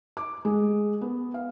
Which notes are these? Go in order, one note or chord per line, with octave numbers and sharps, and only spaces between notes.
D6
G#3
B3
F5